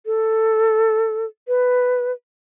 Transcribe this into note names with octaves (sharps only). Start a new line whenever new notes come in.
A4
B4